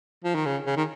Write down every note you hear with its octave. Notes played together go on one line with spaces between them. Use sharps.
F3
D#3
C#3
C#3
D#3